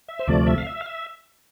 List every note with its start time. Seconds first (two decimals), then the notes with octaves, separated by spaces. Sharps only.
0.08 E5
0.19 C5
0.27 D2 C3 F3 A3 D5
0.47 E5
0.58 F5
0.67 E5
0.81 F5
0.86 E5